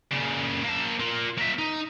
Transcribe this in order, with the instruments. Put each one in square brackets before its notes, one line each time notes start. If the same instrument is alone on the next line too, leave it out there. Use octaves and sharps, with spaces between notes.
[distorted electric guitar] A#2 C#3
A#3 A5
F4 A#4
A#3 E5
D#4